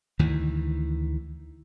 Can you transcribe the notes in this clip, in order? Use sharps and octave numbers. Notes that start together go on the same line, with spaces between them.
D2 D#3 E3